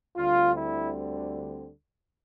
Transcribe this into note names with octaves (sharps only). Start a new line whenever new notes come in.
D2 D3 G3 C4 F4
E4